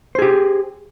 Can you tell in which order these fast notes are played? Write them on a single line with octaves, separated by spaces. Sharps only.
C5 G#4 G4